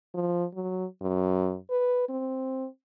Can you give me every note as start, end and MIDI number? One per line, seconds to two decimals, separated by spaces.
0.14 0.45 53
0.54 0.85 54
1.02 1.56 42
1.70 2.06 71
2.09 2.67 60